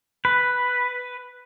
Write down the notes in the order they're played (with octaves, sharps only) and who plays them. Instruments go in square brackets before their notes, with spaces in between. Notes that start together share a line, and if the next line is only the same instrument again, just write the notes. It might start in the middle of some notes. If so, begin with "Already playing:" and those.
[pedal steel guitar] B4